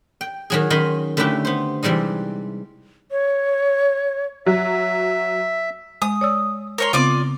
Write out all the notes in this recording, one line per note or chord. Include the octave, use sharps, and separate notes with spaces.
G5
D#3 F#3 G#4
D#3 C#4 D#5 B5 C6
D3 A3 C#4 E4 G4 B4
B3 C5
C3 E3 G3 G#3 D#4
C#5
F#3 E5
G#3 D#6
C#5 D5 E6
A#4 C#5 C6
C#3 B3 C4 F4 D5 D6